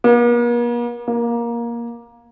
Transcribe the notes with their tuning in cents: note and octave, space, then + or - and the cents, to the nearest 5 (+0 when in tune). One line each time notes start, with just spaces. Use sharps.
A#3 +45
A#3 +15